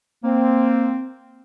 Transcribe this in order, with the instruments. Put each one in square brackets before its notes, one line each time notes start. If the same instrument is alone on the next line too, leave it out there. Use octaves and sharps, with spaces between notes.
[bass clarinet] A#3 [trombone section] C4